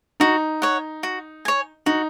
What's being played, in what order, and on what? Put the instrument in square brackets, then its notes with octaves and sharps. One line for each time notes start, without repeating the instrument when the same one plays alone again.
[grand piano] D#4 [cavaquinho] F#4
[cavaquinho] C#5 F#5
F#4
C#5 G#5
[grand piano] D#4 [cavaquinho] F#4